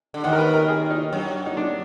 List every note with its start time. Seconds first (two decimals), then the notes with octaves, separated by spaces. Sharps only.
0.14 D3
0.24 D#2 D#3 F#5
0.33 A#4
0.39 B4
0.54 A#4
0.68 G#4
0.91 D#4
1.13 F#2 F#3
1.46 D#4
1.57 D4